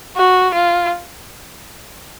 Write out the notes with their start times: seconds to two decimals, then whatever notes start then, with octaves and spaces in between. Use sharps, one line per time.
0.17 F#4
0.54 F4